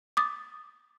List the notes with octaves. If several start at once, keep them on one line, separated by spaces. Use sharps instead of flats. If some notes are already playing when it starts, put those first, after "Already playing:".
D6 D#6 A6